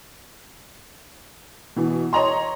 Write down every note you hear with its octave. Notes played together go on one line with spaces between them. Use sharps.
B2 E3
C#5 D#5 A#5 C6